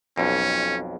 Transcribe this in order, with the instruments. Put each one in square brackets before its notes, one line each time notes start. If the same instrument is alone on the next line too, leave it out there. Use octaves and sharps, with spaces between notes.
[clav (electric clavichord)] B1 F2 [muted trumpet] C#4